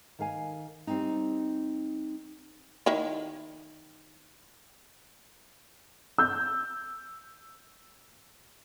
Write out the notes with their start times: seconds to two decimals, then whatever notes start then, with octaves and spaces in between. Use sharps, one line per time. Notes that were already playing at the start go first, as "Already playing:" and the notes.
0.19 D#3 A#4 F5 G#5
0.87 G3 C4 D#4
2.86 D#3 E4
6.18 E6 G6